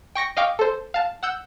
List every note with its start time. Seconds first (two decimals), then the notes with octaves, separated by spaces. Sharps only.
0.15 G5 C#6 A#6 C#7
0.37 D#5 F5 G5 C#6 D6
0.59 A4 C5
0.94 F5 A5
1.23 F#5 E6 G6